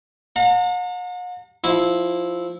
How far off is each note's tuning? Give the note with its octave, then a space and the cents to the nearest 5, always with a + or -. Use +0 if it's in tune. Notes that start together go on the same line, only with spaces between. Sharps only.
F#5 -45 A#5 -40
F3 +0 E4 -10